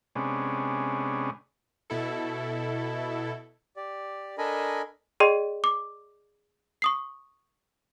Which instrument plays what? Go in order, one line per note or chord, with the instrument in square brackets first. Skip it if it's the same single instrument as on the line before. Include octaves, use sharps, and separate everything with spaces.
[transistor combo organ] C3 G#3 B3 C#4 D4
[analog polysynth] B2 E4 A4
[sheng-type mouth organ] G4 D5
D4 A4 A#4 D#5 G#5 B5
[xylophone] G#4 D5 D#5 G5 C6
D6
C#6 D#6 C7